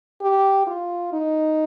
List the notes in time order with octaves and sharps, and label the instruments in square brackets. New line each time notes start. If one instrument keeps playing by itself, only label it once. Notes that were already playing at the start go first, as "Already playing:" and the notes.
[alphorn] G4
F4
D#4